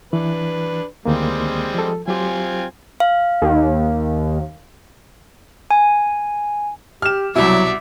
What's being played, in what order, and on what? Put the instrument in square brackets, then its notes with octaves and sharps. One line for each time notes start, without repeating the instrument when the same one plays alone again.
[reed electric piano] E3 [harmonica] D4 B4
[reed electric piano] D2 D#3 A#3 [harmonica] G3 G#3 C4
[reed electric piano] F3 A4
[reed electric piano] F#3 G4 [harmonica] C4 F4 G#5
[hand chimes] F5
[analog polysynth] D#2
[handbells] G#5
[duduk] G4 [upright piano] F6 E7
[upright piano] C2 B2 [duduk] F#3 [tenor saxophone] E4 [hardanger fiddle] D5 E5